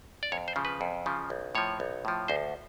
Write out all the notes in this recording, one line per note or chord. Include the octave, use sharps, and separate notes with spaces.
D5
F2 C#5
C5
C#3 F3
B4
F2
C#3 F3
B1
A2 F3 C#5
B1
A2 F3
D2 C5